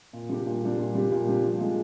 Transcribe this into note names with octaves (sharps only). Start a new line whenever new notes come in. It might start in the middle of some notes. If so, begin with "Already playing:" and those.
A#2
G3 D4 G4
A#2
G3 D4 G4
A#2
G3 D4 G4
A#2
G3 D4 G4
F3
G#3 D4